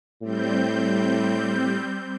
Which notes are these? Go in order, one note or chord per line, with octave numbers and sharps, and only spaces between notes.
A2 G3 C4 G6